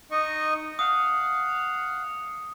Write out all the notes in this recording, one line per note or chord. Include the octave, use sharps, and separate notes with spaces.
D#4 D#5 C#6
F5 F#5 D#6